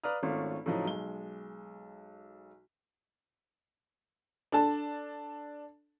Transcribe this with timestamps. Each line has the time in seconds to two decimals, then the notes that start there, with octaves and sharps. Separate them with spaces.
0.04 B4 D5 F5 A#5 D#6 F6
0.23 G#1 A3 C#4 F4
0.66 A2 C#3 F3 F#3 D#4
0.86 B1 G#3 G7
4.52 D4 A4 A5